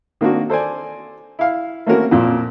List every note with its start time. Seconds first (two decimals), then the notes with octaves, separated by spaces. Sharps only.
0.21 D#3 A#3 C4 D4 F#4
0.50 A4 C5 D5 G#5
1.39 E4 F5
1.86 A3 A#3 C4 C#4 F#4 A#4
2.11 F2 A#2